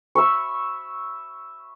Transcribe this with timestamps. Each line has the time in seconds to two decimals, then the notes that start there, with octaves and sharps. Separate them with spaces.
0.15 E5 B5 C#6